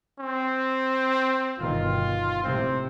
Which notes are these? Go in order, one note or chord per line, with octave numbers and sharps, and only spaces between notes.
C4
G1 B2 D#3 F4
A2 C3 C4